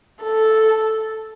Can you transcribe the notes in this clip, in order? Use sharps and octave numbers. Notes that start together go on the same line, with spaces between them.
A4